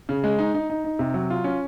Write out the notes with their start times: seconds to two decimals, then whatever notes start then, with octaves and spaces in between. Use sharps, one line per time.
0.09 C#3
0.24 G#3
0.39 D#4
0.54 D#4
0.70 D#4
0.84 D#4
0.99 C3
1.14 F#3
1.30 F4
1.44 C#4